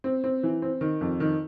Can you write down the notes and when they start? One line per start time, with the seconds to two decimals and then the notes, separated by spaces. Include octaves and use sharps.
0.04 C4
0.24 C4
0.43 E3
0.62 C4
0.81 D#3
1.01 F2
1.20 D#3